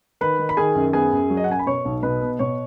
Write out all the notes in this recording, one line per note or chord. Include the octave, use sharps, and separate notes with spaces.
D#3 B4 B5
D#3
B5
D#3 G#4 G#5
F#2
B3 G#4 G#5
F#2
F#3
D#5
F#5
F#2 G#5
B5
B2 C#5 C#6
B1
B2 B4 B5
B3
B2 C#5 C#6